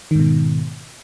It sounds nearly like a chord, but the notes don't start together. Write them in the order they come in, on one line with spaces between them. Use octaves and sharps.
D#3 G#2 B2